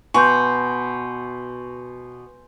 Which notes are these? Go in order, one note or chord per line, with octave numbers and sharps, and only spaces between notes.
B2 G#5 C6 C#6 G6